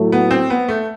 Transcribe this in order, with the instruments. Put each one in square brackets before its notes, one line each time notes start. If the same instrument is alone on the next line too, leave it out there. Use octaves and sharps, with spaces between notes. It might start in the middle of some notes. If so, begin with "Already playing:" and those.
Already playing: [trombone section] A2 F#3 A3
[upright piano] B3
C4
B3
A3